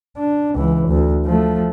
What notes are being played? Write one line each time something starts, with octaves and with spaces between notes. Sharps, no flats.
D4
C#2 E3
D2
F3 A3